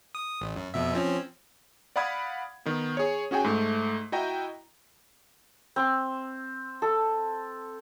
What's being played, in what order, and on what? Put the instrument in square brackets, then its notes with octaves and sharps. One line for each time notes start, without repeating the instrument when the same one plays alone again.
[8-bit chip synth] D#6
A1
F#2
F2 B2 E5
F3 C4 C#4
[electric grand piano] D5 F5 F#5 B5 D#6 G#6
D#3 B3
G#4 C#5
C#4 F#4 G#4 G5 G#5
G#2 A3
E4 F#4 D#5 G5 A#5
[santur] C4
A4